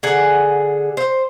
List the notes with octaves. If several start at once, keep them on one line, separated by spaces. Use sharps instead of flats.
D3 G#4 F#5
C5